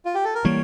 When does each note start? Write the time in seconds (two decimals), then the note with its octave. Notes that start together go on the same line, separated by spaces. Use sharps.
0.05 F4
0.15 G4
0.24 A4
0.35 A#4
0.44 E3 G3 A#3 C#5